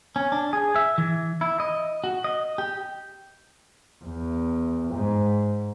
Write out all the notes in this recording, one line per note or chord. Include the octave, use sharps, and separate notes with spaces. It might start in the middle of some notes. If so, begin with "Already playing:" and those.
C#4
D4
G#4
E5
E3
E4
D#5
F#4
D#5
G4
E2
G#2